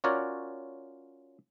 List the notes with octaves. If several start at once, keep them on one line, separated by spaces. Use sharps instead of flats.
C#4 F4 F#4 A#4 C#5 D5